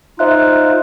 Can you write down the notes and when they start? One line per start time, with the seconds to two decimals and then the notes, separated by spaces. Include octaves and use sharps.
0.19 D#4 F4 C5 E5 F#6